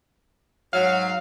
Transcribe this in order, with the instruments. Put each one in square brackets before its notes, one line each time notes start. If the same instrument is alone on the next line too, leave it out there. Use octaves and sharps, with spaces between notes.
[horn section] G#2 F#3 [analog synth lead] F5